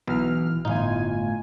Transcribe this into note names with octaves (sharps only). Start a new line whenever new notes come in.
B1 B2 E3 F6
G1 A2 D#4 F4 G#5